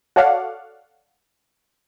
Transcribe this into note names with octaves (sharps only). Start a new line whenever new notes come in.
F#4 A4 C#5 D5 F5 F#5